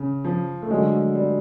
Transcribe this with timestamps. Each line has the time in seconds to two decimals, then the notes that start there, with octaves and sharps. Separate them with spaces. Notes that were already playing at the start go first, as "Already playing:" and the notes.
Already playing: C#3
0.24 F3
0.62 A3
0.70 D3 F#3 G#3
1.15 G3